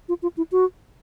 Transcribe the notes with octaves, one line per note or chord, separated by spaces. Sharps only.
F4
F4
E4
F#4